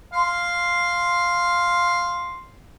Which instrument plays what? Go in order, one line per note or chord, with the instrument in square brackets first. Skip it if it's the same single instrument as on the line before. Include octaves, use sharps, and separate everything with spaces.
[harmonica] F5 C6